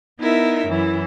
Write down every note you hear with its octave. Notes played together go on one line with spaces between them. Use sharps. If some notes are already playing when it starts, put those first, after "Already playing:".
B3 D#4 E4 A#4 E5
F#2 E3 E4